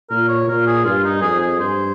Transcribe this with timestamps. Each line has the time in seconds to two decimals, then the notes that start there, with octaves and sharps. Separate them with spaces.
0.10 A#2 A#4
0.29 C#5
0.48 A#2 A#4
0.66 G#4
0.85 G2 F4
1.04 D#4
1.22 F2 G#4
1.40 G#4
1.59 G2 C5